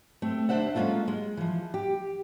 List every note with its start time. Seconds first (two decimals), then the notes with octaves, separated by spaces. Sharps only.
0.22 A3 C4
0.49 D#2 D4 C5 E5 F#5
0.75 G#3 A#3 C4 C#4 F4 A4
1.08 G#3
1.37 E3 F3
1.74 G4